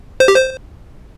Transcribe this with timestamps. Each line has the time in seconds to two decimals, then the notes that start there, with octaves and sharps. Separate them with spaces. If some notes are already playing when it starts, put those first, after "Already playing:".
0.20 C5
0.28 G4
0.36 C5